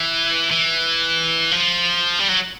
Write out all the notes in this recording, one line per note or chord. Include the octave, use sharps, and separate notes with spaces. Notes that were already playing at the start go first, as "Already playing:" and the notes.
Already playing: E3
E3
F3
G3
F#3